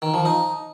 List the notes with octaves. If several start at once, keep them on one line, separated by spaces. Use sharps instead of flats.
D#3
F3
D#4